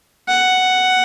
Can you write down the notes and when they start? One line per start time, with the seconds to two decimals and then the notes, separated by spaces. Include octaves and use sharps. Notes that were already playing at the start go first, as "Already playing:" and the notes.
0.29 F#5